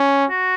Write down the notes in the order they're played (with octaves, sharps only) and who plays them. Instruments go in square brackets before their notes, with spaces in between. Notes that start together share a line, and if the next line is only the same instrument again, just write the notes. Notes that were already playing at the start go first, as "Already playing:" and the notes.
Already playing: [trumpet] C#4
[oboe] F#4